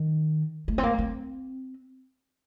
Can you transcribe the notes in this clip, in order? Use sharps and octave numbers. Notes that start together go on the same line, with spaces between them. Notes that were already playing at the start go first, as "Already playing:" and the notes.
Already playing: D#3
A3
C4
A#3
C4